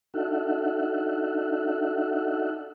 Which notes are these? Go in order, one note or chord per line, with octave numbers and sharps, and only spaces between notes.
D4 D#4 F#4 A4 E5 F#5